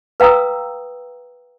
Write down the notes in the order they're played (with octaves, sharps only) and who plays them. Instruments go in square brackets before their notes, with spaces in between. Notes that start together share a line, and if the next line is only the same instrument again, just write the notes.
[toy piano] B4 F5 G5 A#5 D#6 E6